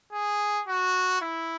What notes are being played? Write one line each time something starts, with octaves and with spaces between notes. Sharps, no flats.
G#4
F#4
E4